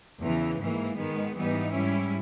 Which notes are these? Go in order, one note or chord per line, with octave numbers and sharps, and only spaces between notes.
E2 C#3 E3
G#2 E3 A#3
G#2 D#3 G#3 B3
G#2 E3 G3 B3 D#4
G#2 G3 C#4 E4